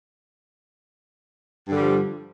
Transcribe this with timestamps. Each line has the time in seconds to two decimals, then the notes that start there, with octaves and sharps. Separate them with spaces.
1.66 G2
1.71 D3
1.75 G3
1.80 F3